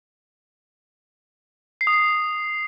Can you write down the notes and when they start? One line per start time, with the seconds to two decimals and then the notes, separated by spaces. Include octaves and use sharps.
1.81 C7
1.87 D#6
1.93 C7